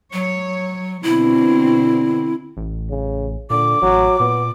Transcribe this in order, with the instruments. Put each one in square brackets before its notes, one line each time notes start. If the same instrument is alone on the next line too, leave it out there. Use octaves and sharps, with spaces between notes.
[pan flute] F#3 [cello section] C#5
[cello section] B2 D3 C4 [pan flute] E4
[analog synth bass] A1
[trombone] C#3
[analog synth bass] A#2 [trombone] D3 [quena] D6
[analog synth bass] A1 [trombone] F#3
[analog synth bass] A#2 [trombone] B3